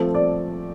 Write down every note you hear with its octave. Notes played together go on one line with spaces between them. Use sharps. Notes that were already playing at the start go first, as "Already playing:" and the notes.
Already playing: F3 A3 C4
D5